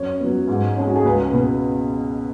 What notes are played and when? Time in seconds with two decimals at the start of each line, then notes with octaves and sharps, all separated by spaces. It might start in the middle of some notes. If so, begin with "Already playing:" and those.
Already playing: F#2 C#5
0.20 F#3 B3
0.48 G#2
0.77 G#3 C#4
0.87 F#4
0.96 G#4
1.04 C#2 B4
1.33 B2 B3